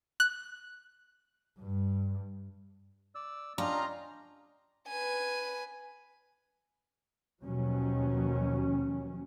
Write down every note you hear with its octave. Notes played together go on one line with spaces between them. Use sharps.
F#6
G2
D5 E6
C#4 D4 F4 G4 D#5 A#5
B4 G#5
D#2 B2 F3 F#3 C#4